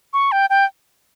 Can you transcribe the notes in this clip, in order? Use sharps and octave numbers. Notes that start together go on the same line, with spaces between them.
C#6
G5
G5